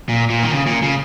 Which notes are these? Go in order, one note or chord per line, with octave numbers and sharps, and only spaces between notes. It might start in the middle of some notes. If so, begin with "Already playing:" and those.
A#2
A#2
D#3
C#3
A#2
C#3